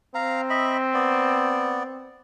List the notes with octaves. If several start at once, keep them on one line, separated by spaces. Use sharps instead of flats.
C4 F5 A#5
D#5 E5 B5
B3 D5